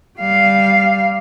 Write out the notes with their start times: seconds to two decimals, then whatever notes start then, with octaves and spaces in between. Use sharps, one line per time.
0.19 G3 F5